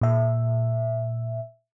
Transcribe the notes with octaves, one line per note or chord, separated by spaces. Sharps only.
A#2 E5